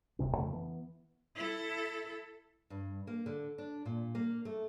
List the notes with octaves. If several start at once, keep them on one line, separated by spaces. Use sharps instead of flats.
D1 C#2 C3 C#4
F2 C#3 A3
E3 B3
E4 A4
G2
A#3
D3
D4
A#2
A#3
A3